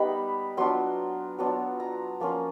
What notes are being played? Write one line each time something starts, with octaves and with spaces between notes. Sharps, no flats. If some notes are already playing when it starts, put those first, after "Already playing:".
Already playing: G3 B3 D#4 D#5 B5
F#3 B3 D4 F4 C6
F#3 B3 D4 F4
A#5
F3 A#3 C#4 F4